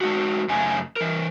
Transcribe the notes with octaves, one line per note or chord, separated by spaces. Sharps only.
G#3 D#4 F#4
F#2 C#3 A3 D#4 G#5
E3 A#4